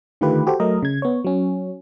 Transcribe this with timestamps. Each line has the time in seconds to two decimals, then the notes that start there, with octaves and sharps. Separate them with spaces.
0.21 D3 D#3 A3 F4 G4 B4
0.47 F#4 G4 A4 C5
0.60 F#3 A3 A#4 D#5
0.83 C#3 G#6
1.02 B3 C#5
1.24 F#3 C#4